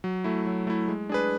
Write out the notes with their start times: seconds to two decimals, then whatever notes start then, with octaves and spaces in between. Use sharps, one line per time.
0.04 F#3
0.24 A3 E4
0.47 F#3
0.67 A3 E4
0.88 G#3
1.09 D4 G#4 B4